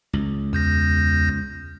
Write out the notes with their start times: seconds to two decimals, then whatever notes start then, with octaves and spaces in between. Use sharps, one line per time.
0.13 C#2
0.53 E2 G6 A#6